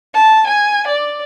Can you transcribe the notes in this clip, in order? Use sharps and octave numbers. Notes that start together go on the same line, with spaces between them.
A5
G#5
D5